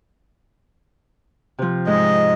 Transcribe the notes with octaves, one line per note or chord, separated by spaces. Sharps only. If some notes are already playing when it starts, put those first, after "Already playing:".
C3 F3
G#2 D#5